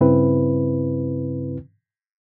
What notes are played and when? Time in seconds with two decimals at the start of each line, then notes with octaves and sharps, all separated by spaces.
0.01 G2 C#3 C4 E4 B4